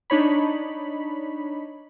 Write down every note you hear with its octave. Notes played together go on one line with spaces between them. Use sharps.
D4 D#4 C#5 B5